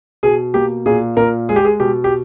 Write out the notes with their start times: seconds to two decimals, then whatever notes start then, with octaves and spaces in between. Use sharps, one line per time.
0.23 B2 G#4
0.54 A#3 G4
0.86 A#2 G#4
1.17 A#2 A#4
1.49 G#3 G#4
1.56 G4
1.65 G#4
1.80 B2 G4
2.04 G4